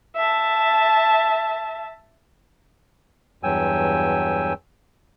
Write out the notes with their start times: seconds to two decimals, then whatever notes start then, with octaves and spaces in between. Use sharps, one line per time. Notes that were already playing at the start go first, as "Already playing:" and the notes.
0.16 E5 A5
3.43 E2 G2 F#3 G5 G#5 E6